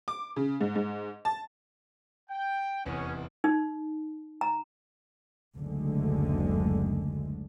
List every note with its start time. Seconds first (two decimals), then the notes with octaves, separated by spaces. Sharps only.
0.08 D6
0.36 C#3
0.61 G#2
0.76 G#2
1.25 A5
2.30 G5
2.86 F1 E2 C#4
3.44 D#4
4.41 A#5
5.56 F#1 D2 D3 G#3